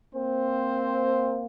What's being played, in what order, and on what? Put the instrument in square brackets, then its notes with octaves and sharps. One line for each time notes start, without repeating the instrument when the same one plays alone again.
[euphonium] A#3 [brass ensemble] C4 C5